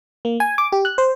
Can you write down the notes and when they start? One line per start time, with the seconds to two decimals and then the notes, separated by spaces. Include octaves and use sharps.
0.25 A#3
0.40 G#5
0.58 D6
0.72 G4
0.85 F#6
0.98 C5